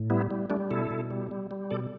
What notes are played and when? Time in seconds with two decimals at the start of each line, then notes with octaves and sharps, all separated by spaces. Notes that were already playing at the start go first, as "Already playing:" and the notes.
Already playing: A2
0.10 G3 B3 E4
0.31 G3
0.50 G3 A3 D4
0.71 B2 E4 A4
0.91 B2
1.11 G3
1.31 G3
1.51 G3
1.71 B2 A4 D5